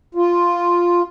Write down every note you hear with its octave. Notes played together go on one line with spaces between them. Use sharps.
F4